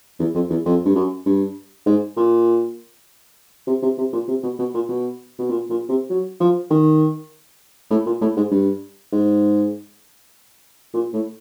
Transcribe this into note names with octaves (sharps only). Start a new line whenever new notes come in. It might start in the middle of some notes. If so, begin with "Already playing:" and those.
E2
F2
E2
F2
G2
F#2
G2
G#2
A#2
C3
C3
C3
A#2
C3
B2
B2
A#2
B2
B2
A#2
A#2
C3
F#3
F3
D#3
A2
A#2
A2
G#2
G2
G#2
A#2
A2